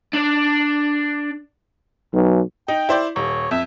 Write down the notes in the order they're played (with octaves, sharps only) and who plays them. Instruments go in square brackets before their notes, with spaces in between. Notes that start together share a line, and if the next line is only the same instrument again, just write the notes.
[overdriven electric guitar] D4 D5
[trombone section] B1
[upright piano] D#4 [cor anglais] G5
[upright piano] E4 C5 D5
[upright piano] D#1 [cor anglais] C#5
[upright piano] F2 [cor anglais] E5